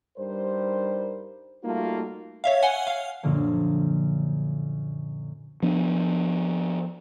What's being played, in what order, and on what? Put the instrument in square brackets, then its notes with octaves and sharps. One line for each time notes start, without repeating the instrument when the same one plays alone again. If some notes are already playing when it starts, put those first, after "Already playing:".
[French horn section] G2 G3 D#4 A#4 C5
G3 A3 A#3 D#4 F4 F#4
[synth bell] C#5 E5 F5
F#5 G#5 G7
F5
[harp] F#2 A#2 D3 F3 A#3
[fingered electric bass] F3 B3 D4